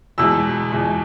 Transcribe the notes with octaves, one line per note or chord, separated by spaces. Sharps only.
E2 B2 G#3 E6
E2 B2 G#3